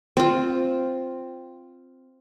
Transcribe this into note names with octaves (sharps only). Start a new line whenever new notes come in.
C4 F4